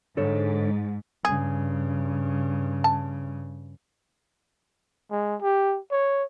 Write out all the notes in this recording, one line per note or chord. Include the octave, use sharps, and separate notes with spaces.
G#2 D3 A4 C#5
G2 C#3 G#4
A5
G#3
G4
C#5